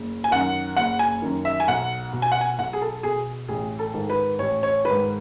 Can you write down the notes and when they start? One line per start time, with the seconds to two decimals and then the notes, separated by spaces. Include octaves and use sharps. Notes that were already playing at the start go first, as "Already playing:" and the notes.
Already playing: F#1
0.24 G#5
0.31 F#2 D#3 F#5
0.76 F#1 F#5
0.99 G#5
1.22 F#2 D#3
1.45 E5
1.60 G#5
1.68 B1 F#5
2.13 B2
2.22 G#5
2.32 F#5
2.41 G#5
2.58 B1 F#5
2.73 G#4
2.81 A4
3.03 B2 G#4
3.48 A1 G#4
3.79 A4
3.94 G#2 D#3
4.10 B4
4.39 A1 C#5
4.63 C#5
4.85 G#2 D#3 B4